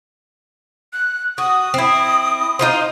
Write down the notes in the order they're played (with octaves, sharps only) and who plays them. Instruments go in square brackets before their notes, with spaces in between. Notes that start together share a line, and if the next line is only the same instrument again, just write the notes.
[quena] F#6
[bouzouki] F#4 [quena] D#6
[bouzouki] C4 E4
D#4 F4 C5